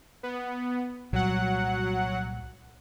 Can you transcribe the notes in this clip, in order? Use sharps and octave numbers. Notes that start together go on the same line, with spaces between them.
B3
C2 A#2 F#3 G3 F#5